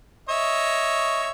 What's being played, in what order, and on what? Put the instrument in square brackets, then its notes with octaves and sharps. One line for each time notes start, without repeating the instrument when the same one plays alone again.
[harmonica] C#5 D#5 E5